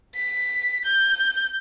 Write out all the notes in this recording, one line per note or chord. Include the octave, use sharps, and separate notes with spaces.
B6
G6